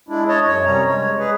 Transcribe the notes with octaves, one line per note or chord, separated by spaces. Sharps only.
G#3 D4 E4
C#5 D#5 A5
F#2 C#5
C3 G3 C#4 A#5
G#3 C#5
G#3 G#4 B4